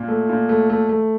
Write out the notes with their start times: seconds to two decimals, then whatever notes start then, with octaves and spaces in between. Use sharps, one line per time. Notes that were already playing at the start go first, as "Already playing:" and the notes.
Already playing: A#2
0.08 A3
0.29 A#2
0.49 A3
0.70 A3
0.89 A3